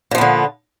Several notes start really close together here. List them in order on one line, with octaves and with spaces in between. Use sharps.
A#2 F3 B3 D3